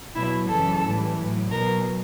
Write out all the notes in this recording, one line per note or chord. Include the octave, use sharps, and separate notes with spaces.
B2 F#3 E4
F#2 C#3 E3 A4
A2 E3 G3
A2 F#3
B2 F#3 A#4